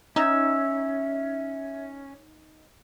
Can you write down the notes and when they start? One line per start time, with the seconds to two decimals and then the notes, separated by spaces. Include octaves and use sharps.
0.16 C#4 D#4 E5 E6 G#6